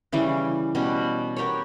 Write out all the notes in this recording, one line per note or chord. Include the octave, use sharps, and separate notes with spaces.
C#3 E3 G3 C#4
B2 G3 C#4
B3 G4 A#4 C#5